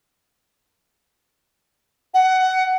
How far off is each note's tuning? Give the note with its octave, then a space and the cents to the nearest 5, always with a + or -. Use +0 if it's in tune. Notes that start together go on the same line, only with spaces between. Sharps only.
F#5 +15